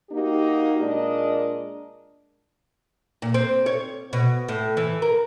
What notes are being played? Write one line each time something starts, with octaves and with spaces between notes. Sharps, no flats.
A#3 D#4 F#4 G4
A#2 G#3 D4 A#4 D#5
A#2
C4
C#5
B2
A2
E3
A#4